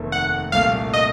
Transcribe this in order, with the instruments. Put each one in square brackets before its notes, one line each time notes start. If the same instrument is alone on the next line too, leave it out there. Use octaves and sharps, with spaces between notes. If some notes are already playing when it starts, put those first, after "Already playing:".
Already playing: [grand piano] F1 D#2 D#3 A3
[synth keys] F#5
[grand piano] C2 A#2 A3 [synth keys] F5
[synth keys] D#5